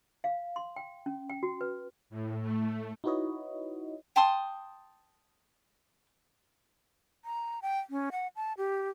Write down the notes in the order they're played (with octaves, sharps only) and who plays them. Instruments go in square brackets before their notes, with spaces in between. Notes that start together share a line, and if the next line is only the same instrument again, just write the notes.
[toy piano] F5
C6
G5
C#4
G5
F#4
B4
[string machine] A2
A3
[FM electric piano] D#4 E4 F#4 B4 C#5 D#5
[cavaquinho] G5 A5 C6 D#6
[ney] A#5
G5
C#4
F#5
A5
G4